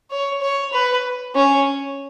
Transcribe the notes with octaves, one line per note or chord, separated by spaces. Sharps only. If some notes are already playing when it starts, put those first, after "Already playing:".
C#5
C#5
B4
C#4